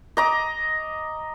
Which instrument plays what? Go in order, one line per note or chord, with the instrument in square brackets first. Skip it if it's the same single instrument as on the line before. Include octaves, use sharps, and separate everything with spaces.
[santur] D#5 A#5 D6